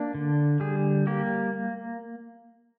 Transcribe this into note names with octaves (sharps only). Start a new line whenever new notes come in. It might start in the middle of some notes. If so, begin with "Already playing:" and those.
Already playing: A#3 D4
D3
G3 G#4
A#3 G4